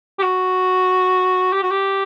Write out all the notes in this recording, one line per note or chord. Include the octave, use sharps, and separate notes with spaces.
G4
F#4
G4
F#4
G4